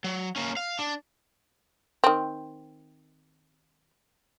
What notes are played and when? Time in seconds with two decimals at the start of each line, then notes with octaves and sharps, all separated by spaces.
0.04 F#3
0.36 A#3 C#4
0.57 F5
0.79 D4
2.04 D#3 C4